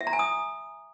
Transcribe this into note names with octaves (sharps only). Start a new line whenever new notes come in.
E5
A#5
G#5
D#6